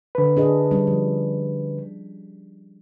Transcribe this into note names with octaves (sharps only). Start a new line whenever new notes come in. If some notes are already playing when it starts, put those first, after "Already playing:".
D3 B4
D4 G#4 D#5
G3 C#4
F3